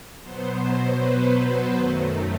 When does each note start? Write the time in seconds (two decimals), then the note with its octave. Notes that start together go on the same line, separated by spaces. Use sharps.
0.22 B2 F#3 B3 C5
0.98 B4
1.75 F#2 D#3 F#3 A3